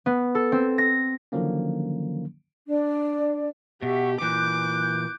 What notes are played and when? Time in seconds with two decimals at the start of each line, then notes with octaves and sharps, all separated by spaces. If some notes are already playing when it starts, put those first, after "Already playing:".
0.06 B3
0.35 A4
0.52 C4
0.78 A#6
1.32 D3 D#3 F3 F#3 A#3 C#4
2.67 D4 D5
3.82 B2 G4 E5 F#5 C#6
4.22 A#2 E3 D6 F#6 G6